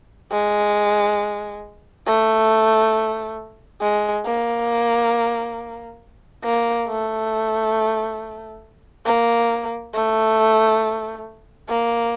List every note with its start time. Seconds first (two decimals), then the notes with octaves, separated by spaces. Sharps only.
0.31 G#3
2.07 A3
3.81 G#3
4.25 A#3
6.44 A#3
6.88 A3
9.06 A#3
9.94 A3
11.69 A#3